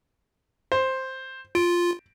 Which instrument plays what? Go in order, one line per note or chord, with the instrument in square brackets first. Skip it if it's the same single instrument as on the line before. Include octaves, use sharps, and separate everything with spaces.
[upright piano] C5
[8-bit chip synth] F4 [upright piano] D7